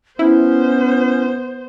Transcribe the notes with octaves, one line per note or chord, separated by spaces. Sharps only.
B3 C#4 E4 C5